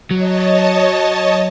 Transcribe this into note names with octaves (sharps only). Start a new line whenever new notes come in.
F#3 C#5 D#5 A5